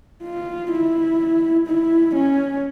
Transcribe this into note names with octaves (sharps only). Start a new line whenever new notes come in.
F4
E4
E4
C#4